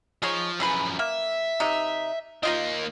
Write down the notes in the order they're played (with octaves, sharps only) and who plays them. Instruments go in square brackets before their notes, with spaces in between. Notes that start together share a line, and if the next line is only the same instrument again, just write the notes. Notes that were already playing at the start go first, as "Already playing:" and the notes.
[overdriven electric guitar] F3 [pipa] D#4 G#4 C#5
[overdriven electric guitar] F#2 F3 [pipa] E3 G#4 B4
[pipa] A#3 [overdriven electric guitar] E5
[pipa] C3 D#4
[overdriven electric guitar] D#3 A#3 [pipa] D#4 F4 D#5